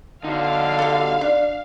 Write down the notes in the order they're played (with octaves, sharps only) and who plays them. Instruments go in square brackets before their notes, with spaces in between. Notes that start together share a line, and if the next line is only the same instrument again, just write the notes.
[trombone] D3 [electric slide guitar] D#4 F#4 [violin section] F5
[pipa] G4 A4
D4